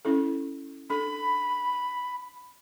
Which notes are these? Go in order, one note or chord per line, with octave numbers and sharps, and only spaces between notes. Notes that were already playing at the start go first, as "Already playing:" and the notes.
C#4 E4 A4
D4 A4 B5